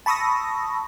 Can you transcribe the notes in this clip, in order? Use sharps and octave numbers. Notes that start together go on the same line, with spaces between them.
A5 B5 C#6 D#6 E6 A#6